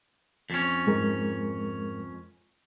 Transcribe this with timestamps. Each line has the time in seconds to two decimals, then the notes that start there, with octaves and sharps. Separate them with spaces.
0.50 F2 C#4
0.87 G#2 G#3 A#4